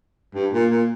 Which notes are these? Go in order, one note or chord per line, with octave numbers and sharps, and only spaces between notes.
G2
A#2
A#2